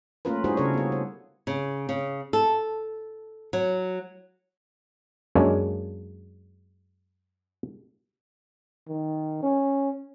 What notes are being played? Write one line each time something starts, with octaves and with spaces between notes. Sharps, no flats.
A3 A#3 C#4 F4 A#4 B4
G3 D4 E4 F#4 G#4 C5
C#3 A4 A#4 C#5
B3 G#4
C5
C#3
C#3
A4
F#3
F#2 G#3 A#3 D4 C#5
D#3
C#4